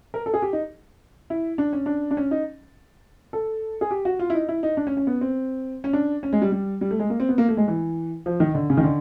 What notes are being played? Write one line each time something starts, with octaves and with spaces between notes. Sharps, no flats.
A#4
A4
G#4
G4
D#4
E4
D4
C#4
D4
D4
C#4
D#4
A4
G#4
G4
F#4
F4
E4
D#4
E4
D#4
D4
C#4
C#4
B3
C4
C#4
D4
C#4
G#3
G3
G3
G3
A3
G#3
A#3
C4
B3
A#3
A3
G#3
E3
F3
D#3
D3
C#3
D#3
D3